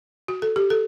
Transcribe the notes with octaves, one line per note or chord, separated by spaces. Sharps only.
F#4
A4
G4
A4